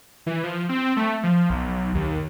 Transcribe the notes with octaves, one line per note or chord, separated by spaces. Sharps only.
E3
F3
C4
A3
F3
B1
D#2